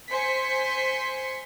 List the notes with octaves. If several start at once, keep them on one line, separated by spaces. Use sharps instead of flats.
C5 G#5 C6 B6 C#7